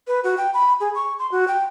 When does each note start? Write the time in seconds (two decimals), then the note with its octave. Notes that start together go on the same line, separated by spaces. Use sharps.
0.07 B4
0.24 F#4
0.37 G5
0.54 B5
0.80 G#4
0.95 C#6
1.19 C6
1.32 F#4
1.48 G5